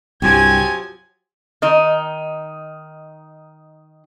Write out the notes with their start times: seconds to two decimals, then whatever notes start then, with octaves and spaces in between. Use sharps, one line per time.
0.22 C2 G2 F3 F#3 G4 G#5 G#6
1.62 D#3 D#4